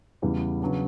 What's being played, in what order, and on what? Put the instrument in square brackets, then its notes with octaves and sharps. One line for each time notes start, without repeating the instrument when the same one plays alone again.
[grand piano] E2 C#3 E3 G3 B3
C#3 F#3 B3 D4